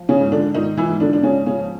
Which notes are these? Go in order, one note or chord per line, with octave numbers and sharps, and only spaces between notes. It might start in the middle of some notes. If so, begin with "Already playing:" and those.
Already playing: F3
C#3 C#4
G#2
D3 D4
G#2 D#3 D#4
E3 E4
G#2
D3 D4
D4
G#2 C#3 C#4
C#3 C#4
F3